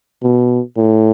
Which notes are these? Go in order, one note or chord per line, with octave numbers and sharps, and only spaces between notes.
B2
A2